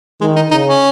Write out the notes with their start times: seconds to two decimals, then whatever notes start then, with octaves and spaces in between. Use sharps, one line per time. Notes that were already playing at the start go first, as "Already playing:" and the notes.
0.21 D#3 G#3
0.36 D#4
0.51 C#3 D#4
0.67 C#4